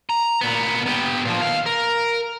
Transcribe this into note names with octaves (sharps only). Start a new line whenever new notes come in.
A#5
A#2 B3
B3 G4
A#2 F3
D#3 F5
A#4